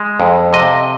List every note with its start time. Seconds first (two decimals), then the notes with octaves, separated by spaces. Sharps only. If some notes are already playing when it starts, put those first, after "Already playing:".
Already playing: G#3
0.20 F2
0.53 C3 D#5